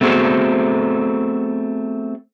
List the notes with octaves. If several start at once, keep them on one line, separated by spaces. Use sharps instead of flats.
A3 B3 C4 F#4 G#4 A4